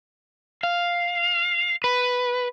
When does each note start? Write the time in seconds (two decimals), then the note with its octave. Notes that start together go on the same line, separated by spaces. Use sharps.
0.63 F5
1.84 B4